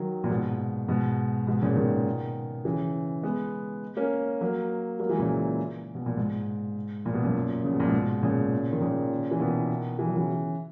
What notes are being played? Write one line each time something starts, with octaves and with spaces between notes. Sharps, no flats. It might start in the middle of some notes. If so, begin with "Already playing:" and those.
Already playing: D#3 F#3
A#2
G#2 B2
G#2 B2
G#2 B2
A#2 C#3
B2 D#3
C#3 E3
G#3 B3
A#3 C#4
F#3 A#3
F#3 A#3
E3 G#3
A#2 C#3
B2
A#2
G#2
A#2
B2
F#2 A#2
C#3
B2
A#2
G#2 B2
A#2 C#3
D#3
A#2 C#3
E3
B2 D#3
E3
F#3
C#3 E3